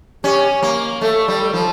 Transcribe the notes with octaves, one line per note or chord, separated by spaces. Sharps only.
C#4 G4
A#3
A3 A4
G3
F3